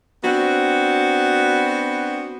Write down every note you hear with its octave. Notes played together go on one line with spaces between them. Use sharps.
B3 C4 D4 F#4